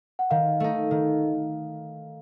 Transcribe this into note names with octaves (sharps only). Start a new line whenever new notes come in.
F#5
D#3 F5
A3 D#4
D#3